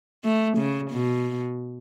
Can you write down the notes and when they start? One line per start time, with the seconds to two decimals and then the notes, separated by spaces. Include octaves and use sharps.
0.24 A3
0.57 C#3
0.91 B2